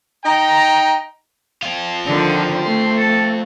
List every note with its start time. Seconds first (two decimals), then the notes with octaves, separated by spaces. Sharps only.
0.24 D#4 G5 A#5
1.63 C4 F4
2.06 D3 D#3 F3
2.63 A3 C6
2.98 A4